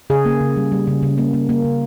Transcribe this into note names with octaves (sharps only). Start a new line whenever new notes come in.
C#3 G#4
A#3
C#3
G3
G3
C#3
C#3
A#3
A#3
A#3
C#3